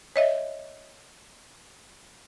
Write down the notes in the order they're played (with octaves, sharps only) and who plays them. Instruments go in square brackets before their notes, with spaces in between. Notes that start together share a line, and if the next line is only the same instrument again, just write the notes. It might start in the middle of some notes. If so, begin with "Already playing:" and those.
[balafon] C#5 D#5 E5